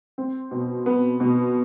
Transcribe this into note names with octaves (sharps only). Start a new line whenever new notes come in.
C4
B2
B3
B2